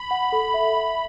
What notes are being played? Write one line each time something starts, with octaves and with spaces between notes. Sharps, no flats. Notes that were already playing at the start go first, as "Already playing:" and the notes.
Already playing: B5
F#5
A4
E5
E5